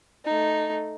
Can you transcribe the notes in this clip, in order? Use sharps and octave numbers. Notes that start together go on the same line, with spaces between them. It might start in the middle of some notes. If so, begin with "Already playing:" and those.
A3 D#4